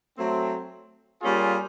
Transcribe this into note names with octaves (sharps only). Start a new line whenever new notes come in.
F#3 A3 C4
G3 A#3 C#4 F4 G#4